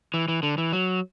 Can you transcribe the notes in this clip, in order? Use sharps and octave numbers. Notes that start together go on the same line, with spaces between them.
E3
E3
D3
E3
F#3